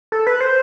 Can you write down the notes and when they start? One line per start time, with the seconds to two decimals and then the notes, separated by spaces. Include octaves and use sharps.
0.12 A4
0.27 B4
0.40 C5